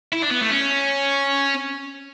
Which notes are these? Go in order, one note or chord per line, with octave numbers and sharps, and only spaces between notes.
E4
D4
B3
A3
C#4